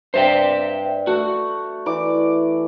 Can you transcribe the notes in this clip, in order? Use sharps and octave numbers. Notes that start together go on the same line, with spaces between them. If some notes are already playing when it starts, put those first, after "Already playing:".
G2 C5 E5 G5
A3 F#4
E3 D5 D6